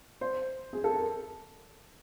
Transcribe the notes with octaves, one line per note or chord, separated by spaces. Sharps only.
C5
G#4
A4
A#4